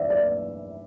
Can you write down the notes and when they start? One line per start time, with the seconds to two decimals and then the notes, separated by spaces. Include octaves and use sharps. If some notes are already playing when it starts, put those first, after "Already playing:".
Already playing: E3 D5 E5
0.10 D5